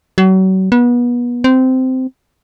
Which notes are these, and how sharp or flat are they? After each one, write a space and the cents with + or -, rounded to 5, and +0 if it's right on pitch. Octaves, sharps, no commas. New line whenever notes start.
F#3 +35
B3 -30
C4 -15